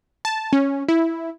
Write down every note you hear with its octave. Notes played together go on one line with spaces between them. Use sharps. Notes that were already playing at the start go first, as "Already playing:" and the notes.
A5
C#4
E4